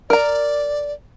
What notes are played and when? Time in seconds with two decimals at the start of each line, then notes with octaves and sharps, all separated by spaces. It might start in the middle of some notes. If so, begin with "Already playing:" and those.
0.10 A#4 D5 A#5